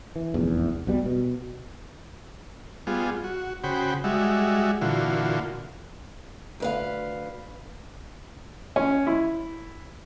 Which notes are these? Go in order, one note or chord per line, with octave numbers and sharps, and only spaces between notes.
E3
F1 A#1 E2
B1 B2 G3
B2
G3 B3 F4 G#4
F#4
C#3 F#4 C5 G5 B5
G3 G#3 F#4 E5
A#2 D3 E3 F4 F#4
D2 B4 F5
C#4
E4